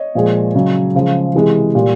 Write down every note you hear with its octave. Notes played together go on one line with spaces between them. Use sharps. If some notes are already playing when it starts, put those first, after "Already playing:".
Already playing: C#5 D#5
A#2 F3 G#3
C#3 F#3
C#3 F3 G#3
C3 E3 G#3
A#2 G3